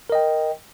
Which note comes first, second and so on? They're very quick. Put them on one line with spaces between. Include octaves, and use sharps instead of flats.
A#4 D#5 G5